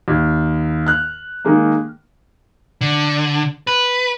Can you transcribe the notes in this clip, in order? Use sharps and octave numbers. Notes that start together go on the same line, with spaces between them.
D#2
F6 F#6
D#3 G#3 A#3
D3
B4